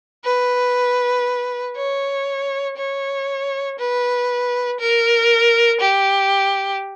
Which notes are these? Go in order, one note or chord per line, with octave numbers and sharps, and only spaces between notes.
B4
C#5
C#5
B4
A#4
G4